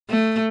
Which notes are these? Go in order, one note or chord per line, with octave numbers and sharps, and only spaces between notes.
A3